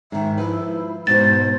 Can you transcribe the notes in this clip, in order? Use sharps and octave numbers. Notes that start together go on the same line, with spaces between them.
G#2 D#3 E5
F3 E4 B4
G#2 B2 F#4 C5 A6